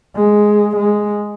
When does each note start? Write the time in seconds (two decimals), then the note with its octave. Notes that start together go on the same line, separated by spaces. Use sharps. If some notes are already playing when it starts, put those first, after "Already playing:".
0.16 G#3
0.77 G#3